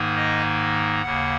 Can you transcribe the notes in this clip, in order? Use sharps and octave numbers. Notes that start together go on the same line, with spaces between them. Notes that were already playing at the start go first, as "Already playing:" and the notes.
Already playing: G#2 D#3 A#3 D#4
D#5
D#2 C#3 A#3 F#5